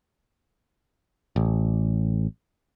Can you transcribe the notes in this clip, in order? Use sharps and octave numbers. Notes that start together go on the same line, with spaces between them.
A1